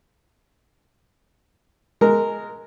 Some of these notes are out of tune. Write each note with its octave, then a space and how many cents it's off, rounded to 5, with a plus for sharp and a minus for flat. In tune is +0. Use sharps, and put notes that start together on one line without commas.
G#3 +10 A#4 -10